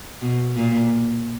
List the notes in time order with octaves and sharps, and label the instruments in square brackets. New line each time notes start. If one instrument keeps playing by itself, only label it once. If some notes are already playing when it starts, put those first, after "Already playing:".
[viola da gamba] B2
A#2